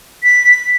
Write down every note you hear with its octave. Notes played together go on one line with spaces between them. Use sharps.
B6